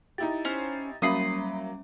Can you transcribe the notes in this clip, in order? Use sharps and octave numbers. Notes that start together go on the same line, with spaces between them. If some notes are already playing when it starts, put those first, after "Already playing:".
D#4 E4 G4 A6
C#4 C5
F#3 G3 A#3 C#4 E5 B5 C6 D#6